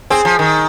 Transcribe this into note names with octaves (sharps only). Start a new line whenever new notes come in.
C4 G#4
F3
D#3